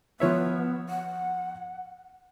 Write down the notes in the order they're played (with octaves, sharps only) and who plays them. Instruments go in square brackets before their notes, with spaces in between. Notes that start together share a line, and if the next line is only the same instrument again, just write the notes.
[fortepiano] F3 C#5 E5 [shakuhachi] B3
[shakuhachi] F#5